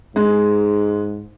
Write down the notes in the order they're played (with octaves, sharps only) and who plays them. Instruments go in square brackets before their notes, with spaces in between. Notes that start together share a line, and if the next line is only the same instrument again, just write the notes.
[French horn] G#2 [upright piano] G#3